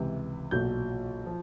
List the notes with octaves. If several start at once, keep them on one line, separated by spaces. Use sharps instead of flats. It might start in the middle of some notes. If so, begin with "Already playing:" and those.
Already playing: C#2 C3 E3
B1 A#2 F#3 G6
F3